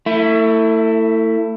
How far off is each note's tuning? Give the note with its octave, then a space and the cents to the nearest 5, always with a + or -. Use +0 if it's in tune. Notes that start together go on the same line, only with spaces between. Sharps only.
A3 +30 E4 +0